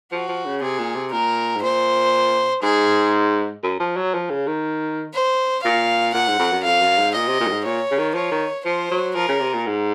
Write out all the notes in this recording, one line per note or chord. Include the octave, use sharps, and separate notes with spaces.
F3 F#4
F3
C#3
C3 G#4
A#2
C3
A#2 A#4
G#2
A#2 C5
G#2 G#4
F#2
F3
F#3
F3
C#3
D#3
C5
A#2 F5
A#2 F#5
G#2
F2
F#2
F2 F5
F#2
G#2
A#2 D#5
C3
A#2
F#2
G#2
A#2 C#5
C#3
D#3
F3 C#5
D#3
F3 C5
F#3
F3 A#4
C#3
C3
A#2
G#2